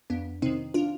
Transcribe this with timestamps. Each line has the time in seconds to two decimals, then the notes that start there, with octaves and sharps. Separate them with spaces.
0.10 F2 B3 D4
0.42 C3 D#3 C4 D#4
0.74 D4 F4